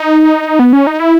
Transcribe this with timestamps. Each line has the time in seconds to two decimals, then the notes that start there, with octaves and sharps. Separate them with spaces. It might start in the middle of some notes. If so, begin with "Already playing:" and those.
Already playing: D#4
0.59 B3
0.73 C#4
0.87 D#4
1.00 E4